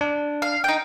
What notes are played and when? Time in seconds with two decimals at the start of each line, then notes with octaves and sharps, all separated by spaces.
0.01 D4
0.42 F5
0.64 D#4 G5